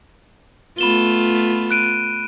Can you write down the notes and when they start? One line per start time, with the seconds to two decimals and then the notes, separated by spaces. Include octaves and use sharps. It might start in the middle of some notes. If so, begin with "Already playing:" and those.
0.78 A3 B3 F4 B5 E7 G7
1.71 F#6 D7 D#7